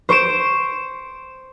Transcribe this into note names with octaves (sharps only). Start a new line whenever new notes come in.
C5 C#6 D7 E7